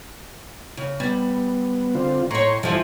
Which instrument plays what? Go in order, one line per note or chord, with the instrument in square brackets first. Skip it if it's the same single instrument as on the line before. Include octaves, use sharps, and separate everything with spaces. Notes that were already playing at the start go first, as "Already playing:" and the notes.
[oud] C#3
[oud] G3 [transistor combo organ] B3
[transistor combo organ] D3 C4 F4
[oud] A2 C#5 [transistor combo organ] A#5 C6 C#6
[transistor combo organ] G2 [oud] E3 F3